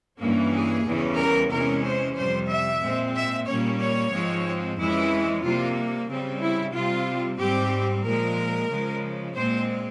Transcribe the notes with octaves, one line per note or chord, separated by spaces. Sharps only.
G2 E3 A#3 C#4
G#4
E2 C#3 E3 G3 C#4
A#4
C3 E3 G#3 C#4 A#4
C5
F2 C3 G3 C5
E5
A#2 G#3 C4
E5
A#2 G3 A#3 C#4 C#5
C#5
G#2 F3 G#3 C4
F2 E3 G#3 C#4 E4
C3 G3 A#3 F4
C#3 G3 C4
E4
C3 G3 C4 F4
G#2 G3 C4 G4
A#2 F3 G#3 A#4
C#3 F3 G#3
A#2 G#3 C4 C5